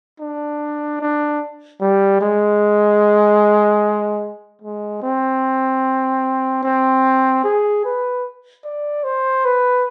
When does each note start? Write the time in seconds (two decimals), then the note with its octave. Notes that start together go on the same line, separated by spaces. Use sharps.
0.20 D4
1.01 D4
1.81 G3
2.21 G#3
4.62 G#3
5.02 C4
6.63 C4
7.44 G#4
7.84 B4
8.64 D5
9.04 C5
9.45 B4